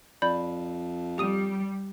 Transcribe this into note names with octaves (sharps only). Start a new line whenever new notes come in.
F2 D5 B5 G6
G3 G4 D#6 D#7